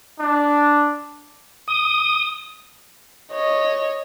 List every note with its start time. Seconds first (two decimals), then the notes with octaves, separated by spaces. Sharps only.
0.19 D4
1.68 D#6
3.32 C#5 D#5